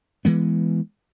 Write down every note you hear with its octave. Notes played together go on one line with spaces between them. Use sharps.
E3 G#3 B3